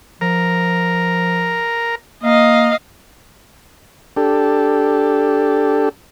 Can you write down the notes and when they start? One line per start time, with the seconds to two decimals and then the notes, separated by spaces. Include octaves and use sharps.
0.21 F3 A#4
2.24 A#3 D#5 F5
4.17 D4 G4 A4